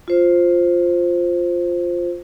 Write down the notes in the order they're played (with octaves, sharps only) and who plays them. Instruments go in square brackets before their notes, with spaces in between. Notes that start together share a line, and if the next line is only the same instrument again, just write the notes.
[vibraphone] F4 C5